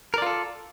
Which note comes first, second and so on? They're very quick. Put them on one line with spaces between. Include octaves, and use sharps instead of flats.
A#4 D5 F4 A4